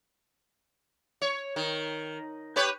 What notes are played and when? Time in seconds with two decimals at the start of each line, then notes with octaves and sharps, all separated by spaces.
1.21 C#5
1.56 D#3
2.56 G4 B4 C#5